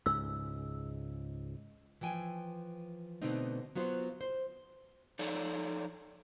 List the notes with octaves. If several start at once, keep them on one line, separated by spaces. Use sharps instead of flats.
C#2 G#2 E6
E3 F3 G5 G#5
B2 D3 A3 B3 C4 D#4
F#3 B3 F4 C5
C5
F3 D#4 A4 C#5 D5